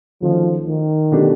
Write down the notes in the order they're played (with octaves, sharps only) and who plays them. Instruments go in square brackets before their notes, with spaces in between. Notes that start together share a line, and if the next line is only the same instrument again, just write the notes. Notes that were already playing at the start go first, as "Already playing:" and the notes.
[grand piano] D#3 F#3 A3 C#4 [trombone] F3
[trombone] D#3
[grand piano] B2 F#3 A3 D4 G4